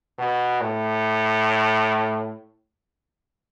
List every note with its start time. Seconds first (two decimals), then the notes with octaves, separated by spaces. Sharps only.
0.18 B2
0.61 A2